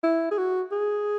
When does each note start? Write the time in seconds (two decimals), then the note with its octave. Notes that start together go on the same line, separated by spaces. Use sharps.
0.04 E4
0.31 G#4
0.38 F#4
0.72 G#4